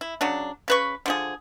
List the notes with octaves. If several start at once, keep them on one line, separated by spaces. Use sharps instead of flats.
E4
C#3 F#3 D4
C#3 B4 C#6
D3 F3 G#4